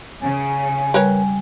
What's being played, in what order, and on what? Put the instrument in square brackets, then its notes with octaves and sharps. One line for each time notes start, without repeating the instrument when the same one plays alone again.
[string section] C#3 [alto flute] G#5
[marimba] G3 [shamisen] A#4 B4 C#5